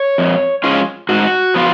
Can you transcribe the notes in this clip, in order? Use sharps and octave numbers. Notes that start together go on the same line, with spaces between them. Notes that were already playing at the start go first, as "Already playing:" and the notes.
Already playing: C#5
F2
F3 G#3 C#4 F4
G#2 F#4
F3 B3 F4